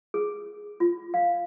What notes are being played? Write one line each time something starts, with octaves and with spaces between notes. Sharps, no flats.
G#4
F4
F5